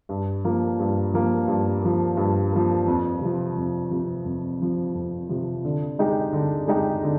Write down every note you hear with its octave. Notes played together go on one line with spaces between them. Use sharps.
G2
F3 A#3
G2
F3 A#3
G2
F3 A#3
G2
F3 A#3
F2
C3 F3
F2
C3 F3
F2
C3 F3
F2
C3 F3
D3
G#3 D#4 G4
D3
G#3 D#4 G4
D3